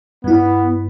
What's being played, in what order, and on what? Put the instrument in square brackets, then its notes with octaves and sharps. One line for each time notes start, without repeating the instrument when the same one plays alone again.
[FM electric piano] G2 E4 [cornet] B3